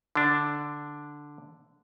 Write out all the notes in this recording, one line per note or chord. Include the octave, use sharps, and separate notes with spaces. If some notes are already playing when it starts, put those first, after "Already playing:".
D3 D4